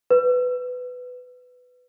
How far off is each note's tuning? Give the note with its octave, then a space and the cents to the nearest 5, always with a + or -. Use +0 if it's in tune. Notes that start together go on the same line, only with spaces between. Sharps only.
B4 +15